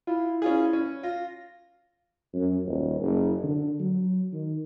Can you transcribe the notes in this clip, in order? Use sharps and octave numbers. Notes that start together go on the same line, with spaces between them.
E4 F4
C#4 F4 G#4
C#4
F4 A#6
F#2
D#1
F#1
D3
F#3
D#3